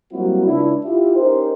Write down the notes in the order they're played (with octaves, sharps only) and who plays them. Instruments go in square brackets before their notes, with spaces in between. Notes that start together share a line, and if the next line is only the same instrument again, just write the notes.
[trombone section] F#3 G3 A#3 C4 E4 F#4
C#2 D4 E4
E4 F4 G4
C#4 D#4 G4 A#4 C5